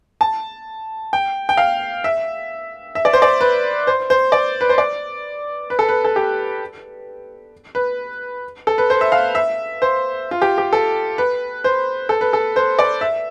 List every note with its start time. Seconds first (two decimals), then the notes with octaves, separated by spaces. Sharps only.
0.21 A5
1.13 G5
1.49 G5
1.57 F5
2.04 E5
2.95 E5
3.05 D5
3.13 C5
3.22 D5
3.41 B4
3.87 C5
4.10 C5
4.32 D5
4.61 B4
4.69 C5
4.78 D5
5.70 B4
5.79 A4
5.89 B4
6.04 A4
6.16 G4
7.75 B4
8.67 A4
8.78 B4
8.90 C5
9.01 E5
9.12 F5
9.35 E5
9.82 C5
10.31 F4
10.42 G4
10.58 G4
10.73 A4
11.18 B4
11.64 C5
12.09 A4
12.21 B4
12.33 A4
12.56 C5
12.79 D5
13.01 E5